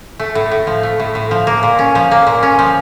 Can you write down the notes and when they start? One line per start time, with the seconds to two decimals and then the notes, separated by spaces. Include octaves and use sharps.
0.20 A3
0.35 A2
0.52 A2
0.67 F3
0.83 A3
1.00 A2
1.15 A2
1.31 F3
1.47 A#3
1.63 A#2
1.79 C#4
1.95 F3
2.11 A#3
2.27 A#2
2.43 C#4
2.59 F3